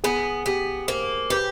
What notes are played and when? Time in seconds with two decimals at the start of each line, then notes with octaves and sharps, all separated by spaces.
0.04 B3 G#4
0.46 B3 G4
0.88 A#3 C5
1.30 G4 B4